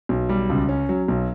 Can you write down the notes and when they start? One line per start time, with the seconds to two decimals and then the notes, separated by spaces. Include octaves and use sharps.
0.09 B1
0.29 G3
0.50 C#2
0.69 C#4
0.89 F#3
1.08 B1